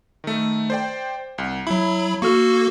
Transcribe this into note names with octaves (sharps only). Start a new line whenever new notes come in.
D#3 A3
C5 D5 G5
C2
F#3 E4 B5
A#3 F#4 A4 C#6 F6